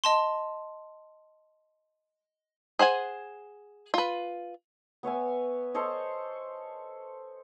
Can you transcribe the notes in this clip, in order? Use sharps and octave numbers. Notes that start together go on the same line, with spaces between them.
D#5 A5 C6
G#4 C5 F#5 G#5
F4 B4
B3 C#5 E5 G#5
A4 C5 C#5 D#5